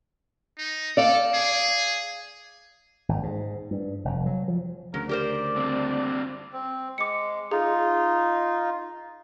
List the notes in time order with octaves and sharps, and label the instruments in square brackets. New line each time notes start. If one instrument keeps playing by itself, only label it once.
[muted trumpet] D#4
[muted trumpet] A4 [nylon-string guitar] D5 F5
[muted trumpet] G#4
[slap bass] G#1
G#2
G2
F1
F#3
F3
[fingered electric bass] D2 C#3 [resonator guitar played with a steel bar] F#3 [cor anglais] A#4
[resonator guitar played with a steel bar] G4 A#4 C5 [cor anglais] D5
[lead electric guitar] G2 C4
[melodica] C4
[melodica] G#3 [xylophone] D6 C#7
[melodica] D#4 F4 [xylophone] G#4